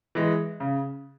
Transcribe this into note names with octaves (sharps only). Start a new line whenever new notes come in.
E3 G#3
C#3